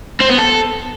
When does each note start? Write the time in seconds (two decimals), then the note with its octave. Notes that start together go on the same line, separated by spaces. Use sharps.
0.20 C4
0.29 B3
0.38 A4